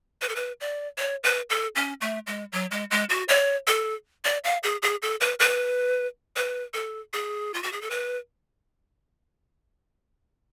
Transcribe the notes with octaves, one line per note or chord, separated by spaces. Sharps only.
B4
A4
B4
D5
C#5
B4
A4
C#4
A3
G#3
F#3
G#3
G#3
F#4
C#5
A4
D5
F5
G#4
G#4
A4
B4
B4
B4
A4
G#4
F4
F#4
G#4
A4
B4